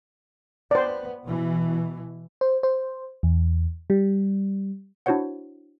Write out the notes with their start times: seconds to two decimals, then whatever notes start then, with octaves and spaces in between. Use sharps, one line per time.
0.71 B3 C5 D5
1.25 B2 E3
2.41 C5
2.63 C5
3.23 E2
3.90 G3
5.06 D4 E4 F#4 C5 C#5 F#5